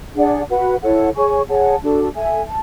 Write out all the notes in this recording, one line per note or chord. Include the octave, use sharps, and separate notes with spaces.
D4 G#4 D5 F#5
F#4 B4 F#5
E4 A4 C#5 F#5
G#4 C#5 G#5 C#6
G#4 C#5 F#5 A5
D4 F#4 A4
A4 E5 G#5
A5